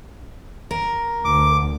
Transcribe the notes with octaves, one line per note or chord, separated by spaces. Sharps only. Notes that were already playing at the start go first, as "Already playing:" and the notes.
A#4
D2 D6